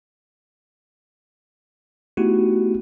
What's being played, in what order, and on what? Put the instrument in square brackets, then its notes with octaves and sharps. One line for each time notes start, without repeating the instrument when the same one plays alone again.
[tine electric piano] A3 B3 D#4 E4 F#4 G4